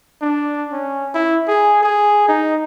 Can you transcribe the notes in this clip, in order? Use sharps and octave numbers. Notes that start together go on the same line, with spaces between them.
D4
C#4
E4
G#4
G#4
D#4